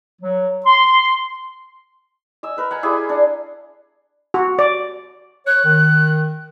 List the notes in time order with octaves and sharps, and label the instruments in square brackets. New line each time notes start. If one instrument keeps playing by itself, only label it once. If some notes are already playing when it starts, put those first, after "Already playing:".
[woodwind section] F#3
C6
[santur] D#5 G#5 E6
A#4 B4 G#5
F#5 G#5 A#5
E4 G4 G#4 G#5
D4 F#5
[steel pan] F#4
D5
[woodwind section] C#5 [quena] F#6
[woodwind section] D#3